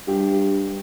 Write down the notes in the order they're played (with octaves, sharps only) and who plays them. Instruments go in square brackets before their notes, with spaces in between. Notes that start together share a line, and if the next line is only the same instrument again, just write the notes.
[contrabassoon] G2 [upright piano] G4